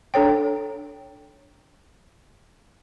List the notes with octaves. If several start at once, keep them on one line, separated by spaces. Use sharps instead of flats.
D4 A4 C#5 G5